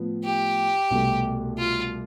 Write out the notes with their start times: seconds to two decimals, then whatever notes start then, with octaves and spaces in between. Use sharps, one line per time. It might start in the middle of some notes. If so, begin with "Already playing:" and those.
Already playing: A2 F3 B3
0.24 G4
0.91 C2 B2 A3
1.58 F4